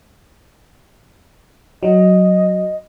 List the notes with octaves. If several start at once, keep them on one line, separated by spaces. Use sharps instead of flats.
F#3 D#5